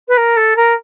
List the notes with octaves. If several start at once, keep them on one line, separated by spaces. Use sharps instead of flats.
B4
A#4
A4
A#4